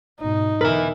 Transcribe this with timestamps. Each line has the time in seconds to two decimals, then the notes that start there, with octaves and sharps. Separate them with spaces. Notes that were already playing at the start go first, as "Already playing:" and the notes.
0.21 G#1 B2 D#4
0.61 E2 B2 D3 A#4 B4 E5